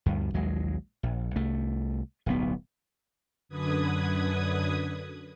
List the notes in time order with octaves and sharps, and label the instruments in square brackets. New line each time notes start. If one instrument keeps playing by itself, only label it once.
[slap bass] D2 G2
A#1 D#2 F#3 G#3
A#1
C2 A3
D1 B1 B3
[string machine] F#2 D3 B4 D#6 G#6